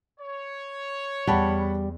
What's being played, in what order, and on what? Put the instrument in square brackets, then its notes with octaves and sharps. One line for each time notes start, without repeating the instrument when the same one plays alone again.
[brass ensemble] C#5
[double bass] E2 [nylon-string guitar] G3 [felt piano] F#5 A5 B5